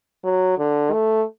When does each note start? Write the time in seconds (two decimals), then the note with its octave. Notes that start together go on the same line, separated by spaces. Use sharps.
0.24 F#3
0.58 D3
0.92 A3